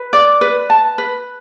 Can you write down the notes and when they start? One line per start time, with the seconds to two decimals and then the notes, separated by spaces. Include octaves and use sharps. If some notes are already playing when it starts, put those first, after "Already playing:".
Already playing: B4
0.13 D5
0.41 B4
0.70 A5
0.98 B4